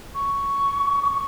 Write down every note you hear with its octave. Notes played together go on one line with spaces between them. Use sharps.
C#6
D6
C#6